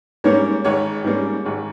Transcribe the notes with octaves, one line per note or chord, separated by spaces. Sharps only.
G#2 G3 A#3 C#4 C#5
G#1 C#5
G#2 G3 A#3 C#4
G#1